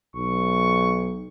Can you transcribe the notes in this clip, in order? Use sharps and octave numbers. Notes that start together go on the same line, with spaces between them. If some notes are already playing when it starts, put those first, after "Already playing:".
B1 C#6